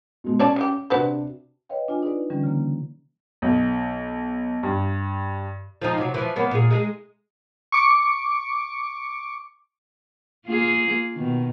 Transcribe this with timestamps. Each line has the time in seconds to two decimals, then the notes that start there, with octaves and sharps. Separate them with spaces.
0.24 B2 G#3
0.39 C#4 C#5 D5 A5
0.56 G3 G4
0.90 C3 D4 F#4 B4 C5
1.69 B4 C#5 D#5 F5 G5
1.88 D4 F4 G#5
2.03 D#4 G#4 B4 D5
2.30 D3 E3 G3 C#4
2.44 C#3 A#3
3.42 B1
4.63 G2
5.82 F3 C4 D#4
5.98 C3 F#3
6.14 E3 F3
6.36 F#2 A#3 B3
6.51 A#2 G#4
6.70 G#3 D#4 G#4
7.72 C#6 D6 C#7
10.46 A#3 F4 G#4
11.15 B2 D#3